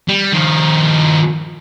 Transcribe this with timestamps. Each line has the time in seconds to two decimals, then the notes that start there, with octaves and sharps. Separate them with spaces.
0.08 G3
0.33 D#3 F3